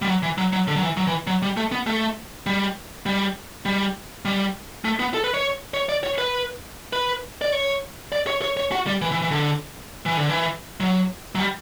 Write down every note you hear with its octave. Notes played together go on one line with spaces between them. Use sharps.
G3
F#3
E3
F#3
F#3
D3
F#3
E3
F#3
E3
F#3
G3
A3
B3
A3
G3
G3
G3
G3
A3
B3
A4
B4
C#5
C#5
D5
C#5
B4
B4
D5
C#5
D5
C#5
C#5
C#5
F#4
G3
E3
E3
E3
D3
E3
D3
E3
F#3
F#3
G3